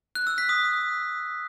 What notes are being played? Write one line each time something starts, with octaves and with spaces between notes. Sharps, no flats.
F#6
E6
B6
D#6